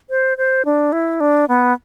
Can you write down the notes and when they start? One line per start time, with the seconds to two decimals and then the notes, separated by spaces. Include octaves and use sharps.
0.10 C5
0.38 C5
0.65 D4
0.92 E4
1.20 D4
1.48 B3